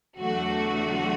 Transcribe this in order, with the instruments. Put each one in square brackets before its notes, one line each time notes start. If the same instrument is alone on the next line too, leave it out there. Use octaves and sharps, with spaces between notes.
[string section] E2 D3 F#3 A3 F#4